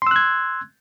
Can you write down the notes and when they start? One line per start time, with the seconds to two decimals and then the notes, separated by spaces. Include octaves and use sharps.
0.02 C6
0.07 E6
0.11 F#6
0.16 G#6